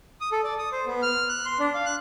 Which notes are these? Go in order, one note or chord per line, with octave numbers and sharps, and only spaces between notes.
D#6
A4
D5
D#6
C5
B3
F6
F#6
C6
D4
F5
F#6